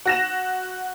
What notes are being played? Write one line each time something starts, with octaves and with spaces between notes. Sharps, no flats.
F#4 A#6 E7